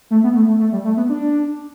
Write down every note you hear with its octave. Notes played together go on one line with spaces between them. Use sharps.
A3
B3
A3
A3
A3
G3
A3
B3
D4